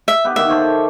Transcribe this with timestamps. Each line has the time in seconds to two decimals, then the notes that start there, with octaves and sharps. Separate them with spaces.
0.08 E5
0.25 B3 G4
0.36 D#3 A#3 B3 E5
0.49 A4 C5 C#5